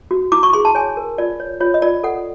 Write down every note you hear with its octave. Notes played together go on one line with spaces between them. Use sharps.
F#4
E4 D6
C#6
G#4 C6
A5
C#5 G#5
A#4
F4 D5
C#5
F4 C#5
D#5
F4 D5
A4 F#5